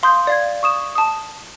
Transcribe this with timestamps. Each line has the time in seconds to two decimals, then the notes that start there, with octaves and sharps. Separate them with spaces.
0.03 F5 C6 D#6 G6
0.27 D5 F5 G#6
0.63 C#6 D#6 E7
0.95 A5 D#6